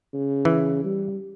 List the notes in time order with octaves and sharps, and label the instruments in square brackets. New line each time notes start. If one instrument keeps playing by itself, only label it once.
[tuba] C#3
[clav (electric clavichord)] E3
[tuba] G3